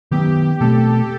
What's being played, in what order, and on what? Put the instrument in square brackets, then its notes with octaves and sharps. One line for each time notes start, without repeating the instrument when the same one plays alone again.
[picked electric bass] D#3 F#3 B3 [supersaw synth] G4
[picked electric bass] B2 A3 C4 [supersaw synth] A4